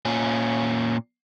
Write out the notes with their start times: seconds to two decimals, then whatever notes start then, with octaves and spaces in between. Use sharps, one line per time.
0.05 A#2 C#4